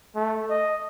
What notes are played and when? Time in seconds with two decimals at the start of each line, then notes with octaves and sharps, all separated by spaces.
0.16 A3
0.50 D#5